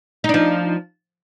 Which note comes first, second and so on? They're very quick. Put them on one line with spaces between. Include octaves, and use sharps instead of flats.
D#4 D4 F3